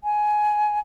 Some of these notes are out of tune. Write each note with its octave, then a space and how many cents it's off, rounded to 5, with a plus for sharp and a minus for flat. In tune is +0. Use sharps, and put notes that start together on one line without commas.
G#5 +15